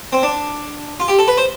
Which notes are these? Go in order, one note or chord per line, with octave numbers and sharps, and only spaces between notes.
C4
D4
F4
G4
A4
B4
C5